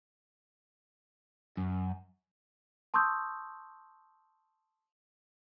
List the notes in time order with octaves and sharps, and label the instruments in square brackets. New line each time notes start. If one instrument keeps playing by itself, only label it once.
[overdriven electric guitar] F#2
[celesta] A5 C6 C#6 D#6 E6 G6